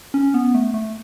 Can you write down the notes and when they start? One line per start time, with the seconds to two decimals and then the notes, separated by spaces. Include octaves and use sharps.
0.14 C#4
0.34 B3
0.55 A3
0.74 A3